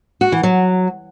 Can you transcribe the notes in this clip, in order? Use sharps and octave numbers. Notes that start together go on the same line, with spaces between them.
F#4
E3
F#3